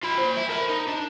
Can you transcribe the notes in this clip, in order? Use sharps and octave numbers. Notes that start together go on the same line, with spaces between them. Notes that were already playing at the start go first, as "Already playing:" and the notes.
F4 B5
A#3 C5
E4
A#4 B5
D#4
D4